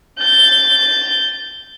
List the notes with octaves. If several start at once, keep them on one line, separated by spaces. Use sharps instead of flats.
G6 A6